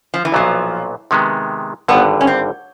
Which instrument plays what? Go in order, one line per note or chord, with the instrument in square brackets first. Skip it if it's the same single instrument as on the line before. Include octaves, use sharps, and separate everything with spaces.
[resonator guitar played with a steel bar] F3
E3
[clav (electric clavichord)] B1 A#2 F#3 B3 [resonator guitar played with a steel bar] F3
[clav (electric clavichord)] C3 D#3 G#3 B3
[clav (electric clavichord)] G#1 G2 D3 [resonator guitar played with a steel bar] B3
[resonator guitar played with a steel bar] C#4
C4